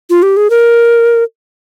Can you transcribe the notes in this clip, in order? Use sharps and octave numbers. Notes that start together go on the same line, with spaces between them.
F4
G4
G#4
A#4